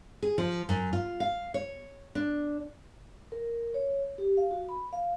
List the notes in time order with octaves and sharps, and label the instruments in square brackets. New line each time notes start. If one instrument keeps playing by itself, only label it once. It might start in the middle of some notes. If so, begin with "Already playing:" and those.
[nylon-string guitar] G#4
F3
F#2
F4
F5
C#5
D4
[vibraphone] A#4
C#5
G4
F5
F#4
B5
F5